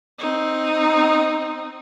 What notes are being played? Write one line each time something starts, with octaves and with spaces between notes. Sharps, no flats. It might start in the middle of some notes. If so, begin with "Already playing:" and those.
C4 D#4